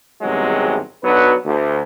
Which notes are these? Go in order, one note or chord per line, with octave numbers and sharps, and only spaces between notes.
G#1 E2 G2 C3 F#3 G#3
B1 F#3 B3 D4 B4
D2